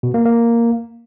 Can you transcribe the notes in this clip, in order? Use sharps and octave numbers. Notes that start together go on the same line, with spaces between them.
B2
A#3
A#3